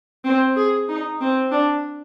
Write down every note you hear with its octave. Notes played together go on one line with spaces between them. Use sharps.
C4
G#4
D#4
C4
D4